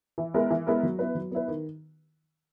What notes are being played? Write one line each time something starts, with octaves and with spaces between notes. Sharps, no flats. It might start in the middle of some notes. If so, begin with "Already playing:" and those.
E3
G#3 B3 E4 A#4
E3
G#3 B3 E4 A#4
F#3
B3 E4 B4
F#3
B3 E4 B4
D#3